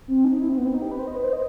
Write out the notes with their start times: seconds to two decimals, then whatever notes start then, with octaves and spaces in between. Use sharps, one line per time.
0.08 C4
0.25 D#4
0.41 E4
0.49 C4
0.57 B3
0.66 C4
0.74 D#4
0.82 G4
0.91 B4
0.99 C5
1.07 D#5
1.16 B4
1.24 C5
1.33 D#5